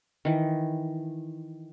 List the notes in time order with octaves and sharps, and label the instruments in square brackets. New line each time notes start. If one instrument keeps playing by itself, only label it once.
[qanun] D#3 E3